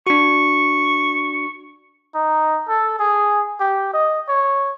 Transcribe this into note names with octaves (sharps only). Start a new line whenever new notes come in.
D4 F#4 C#6
D#4
A4
G#4
G4
D#5
C#5